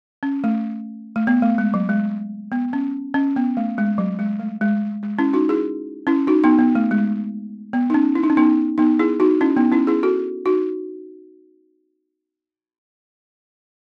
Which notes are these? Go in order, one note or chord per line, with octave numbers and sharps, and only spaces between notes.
C#4
A3
A3
B3
A3
G#3
F#3
G#3
B3
C#4
C#4
B3
A3
G#3
F#3
G#3
A3
G#3
G#3
C#4 E4
D#4 F#4
E4 G#4
C#4 E4
D#4 F#4
B3 D#4
B3
A3
G#3
B3
D#4
C#4
E4
D#4
C#4
B3 D#4
B3 D#4
E4 G#4
D#4 F#4
C#4 E4
B3 D#4
C#4 E4
E4 G#4
F#4 A4
D#4 F#4